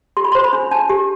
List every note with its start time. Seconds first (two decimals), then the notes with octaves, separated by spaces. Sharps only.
0.17 G4 C6
0.25 B5
0.32 C5 C6
0.44 B5
0.53 D4
0.71 D4 A5
0.89 G4